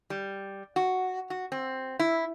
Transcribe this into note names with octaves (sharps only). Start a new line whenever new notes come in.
G3
F#4
F#4
C4
E4